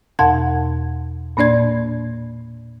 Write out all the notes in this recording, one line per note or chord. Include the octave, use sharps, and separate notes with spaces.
E2 B2 F#5 A5 G#6
A#2 A#3 D4 D5 G#6